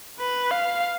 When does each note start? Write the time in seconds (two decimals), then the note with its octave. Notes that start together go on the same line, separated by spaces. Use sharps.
0.19 B4
0.51 F5